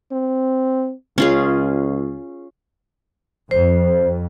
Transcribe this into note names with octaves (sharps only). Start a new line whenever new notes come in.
C4
C#2 C#4 F4 G#4
F2 C5